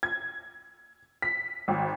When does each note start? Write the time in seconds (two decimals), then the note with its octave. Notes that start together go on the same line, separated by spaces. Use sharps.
0.03 G#6
1.22 B6
1.68 G#1